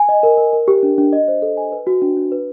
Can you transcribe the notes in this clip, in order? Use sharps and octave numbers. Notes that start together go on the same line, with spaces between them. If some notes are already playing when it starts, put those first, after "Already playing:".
Already playing: G#5
D#5
A#4
A#4
A#4
G4
D4
D4
D#5
C5
A4
G#5
B4
F#4
D4
D4
B4